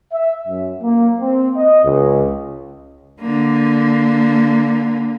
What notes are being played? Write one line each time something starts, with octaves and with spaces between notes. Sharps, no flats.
E5
F#2
A#3
C4
D#5
C#2
D3 A#3